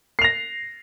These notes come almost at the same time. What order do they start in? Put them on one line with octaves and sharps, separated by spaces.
C7 F7 A#6